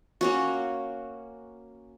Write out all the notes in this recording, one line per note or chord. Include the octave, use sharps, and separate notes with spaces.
A#3 C#4 F#4